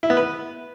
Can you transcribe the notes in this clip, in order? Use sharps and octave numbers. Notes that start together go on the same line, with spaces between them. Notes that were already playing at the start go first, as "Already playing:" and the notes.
E4
B3
B4